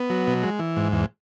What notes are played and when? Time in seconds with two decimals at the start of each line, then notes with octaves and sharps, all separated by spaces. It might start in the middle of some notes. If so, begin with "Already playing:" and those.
Already playing: B3
0.10 F#3
0.27 B2
0.43 G#3
0.59 E3
0.77 G#2
0.92 E2